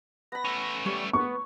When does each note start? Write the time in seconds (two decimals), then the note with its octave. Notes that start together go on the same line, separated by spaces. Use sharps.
0.32 B3 B5 A#6
0.45 A3 C#4
0.86 G3 C#5
1.13 B3 C#6